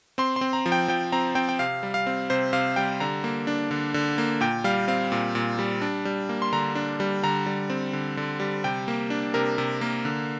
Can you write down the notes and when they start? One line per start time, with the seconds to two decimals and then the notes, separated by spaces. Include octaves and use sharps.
0.18 C4 C6
0.36 C6
0.41 C4
0.53 A#5
0.66 F3
0.72 G5
0.88 F3 G5
1.12 C4 A#5
1.35 C4 G5
1.49 G5
1.59 C3 F5
1.83 G3
1.94 F5
2.07 C4
2.30 C3 C5
2.53 C3 F5
2.76 G3 G5
3.00 D3 A#5
3.24 A#3
3.47 D4
3.71 D3
3.94 D3
4.18 A#3
4.41 A#2 G5
4.64 G3 F5
4.88 C4 F5
5.12 A#2
5.35 A#2
5.59 G3
5.82 D4
6.05 G3
6.29 A#3
6.42 C6
6.52 D3 A#5
6.75 D4
7.00 G3
7.23 D3 A#5
7.46 G3
7.70 C4
7.93 D3
8.17 D3
8.40 G3
8.64 C3 G5
8.88 A#3
9.10 D4
9.34 C3 A#4
9.58 C3
9.81 A#3
10.05 D3